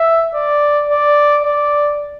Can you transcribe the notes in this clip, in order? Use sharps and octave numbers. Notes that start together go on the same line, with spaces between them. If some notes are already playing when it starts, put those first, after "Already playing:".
Already playing: E5
D5
D5
D5